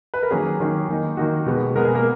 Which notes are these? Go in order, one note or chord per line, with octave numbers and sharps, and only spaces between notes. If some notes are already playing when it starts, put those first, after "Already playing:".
B4
A#4
D#3 F#3 A#3 C#4 G#4
D#3 F#3 A#3 C#4
D#3 A#3 D#4
D#3 A#3 D#4 F#4
B2 G#3 B3
B2 G#3 B3 A#4
G#4
A#3 A#4